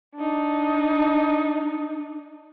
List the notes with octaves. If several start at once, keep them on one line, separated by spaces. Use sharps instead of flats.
D4 D#4